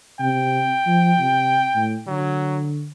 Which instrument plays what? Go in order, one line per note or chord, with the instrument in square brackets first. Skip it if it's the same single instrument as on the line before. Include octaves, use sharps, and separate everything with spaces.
[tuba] C3 [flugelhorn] G5
[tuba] F3
C3
A2
[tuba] D3 [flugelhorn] F#3